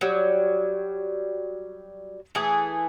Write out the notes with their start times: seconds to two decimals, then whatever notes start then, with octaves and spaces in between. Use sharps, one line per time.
0.01 F#3 G3
2.35 E3 A3 G#4